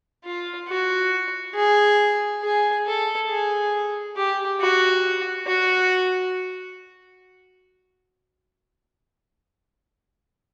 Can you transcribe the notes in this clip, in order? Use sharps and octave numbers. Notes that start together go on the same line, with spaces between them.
F4
F#4
G#4
G#4
A4
G#4
G4
F#4
F#4